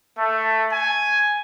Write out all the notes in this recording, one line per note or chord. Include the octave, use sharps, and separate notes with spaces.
A3
G#5